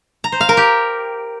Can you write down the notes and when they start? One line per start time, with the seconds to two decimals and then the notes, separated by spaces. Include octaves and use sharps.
0.24 A#5
0.32 C5
0.41 F5
0.49 A#4
0.57 G4